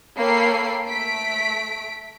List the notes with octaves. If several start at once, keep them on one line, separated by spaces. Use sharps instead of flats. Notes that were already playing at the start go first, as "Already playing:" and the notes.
A#3 A4 C#5 G5 B5 C7
A3 B6 D7